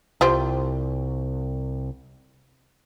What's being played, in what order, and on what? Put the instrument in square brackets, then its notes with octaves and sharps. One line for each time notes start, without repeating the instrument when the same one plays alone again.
[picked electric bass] C2 [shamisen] F4 G4 C5